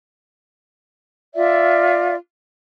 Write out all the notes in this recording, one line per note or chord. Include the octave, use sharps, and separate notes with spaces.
F4 D5 E5